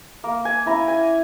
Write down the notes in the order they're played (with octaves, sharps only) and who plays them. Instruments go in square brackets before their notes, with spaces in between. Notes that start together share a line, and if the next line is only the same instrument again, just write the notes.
[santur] A#3
G#5
C#4 E4 A#5
G#5